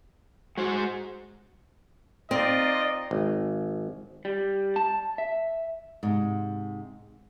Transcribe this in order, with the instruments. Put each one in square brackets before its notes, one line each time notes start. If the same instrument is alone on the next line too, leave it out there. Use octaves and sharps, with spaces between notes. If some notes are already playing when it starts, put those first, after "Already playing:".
[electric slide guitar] G#3 C5 [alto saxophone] F#4
[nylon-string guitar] C4 [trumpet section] D#4 F4 D#5 [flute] D5
[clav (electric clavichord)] G#1
[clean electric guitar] G3
A5
E5
[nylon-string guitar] G#2 C3